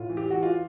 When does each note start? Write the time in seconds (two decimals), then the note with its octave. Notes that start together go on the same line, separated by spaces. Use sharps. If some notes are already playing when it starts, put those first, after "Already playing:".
Already playing: A2 F4
0.10 E3
0.17 G4
0.30 E3 F#4
0.43 F4